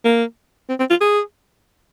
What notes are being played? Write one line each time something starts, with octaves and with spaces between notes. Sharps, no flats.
A#3
C4
C4
F4
G#4